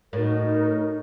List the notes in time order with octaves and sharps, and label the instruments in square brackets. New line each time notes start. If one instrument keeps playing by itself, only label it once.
[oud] A2 [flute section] D#4 F#4 A#4